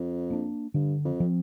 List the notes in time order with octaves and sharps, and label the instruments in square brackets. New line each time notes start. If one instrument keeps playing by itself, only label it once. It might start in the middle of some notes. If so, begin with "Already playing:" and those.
Already playing: [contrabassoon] F2
[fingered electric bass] A#3 D4
[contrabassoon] G2 [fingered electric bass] D3
[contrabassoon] F2
[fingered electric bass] F3 C4